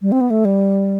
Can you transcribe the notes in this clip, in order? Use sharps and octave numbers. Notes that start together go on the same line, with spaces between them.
G3
C4
B3
A3
G3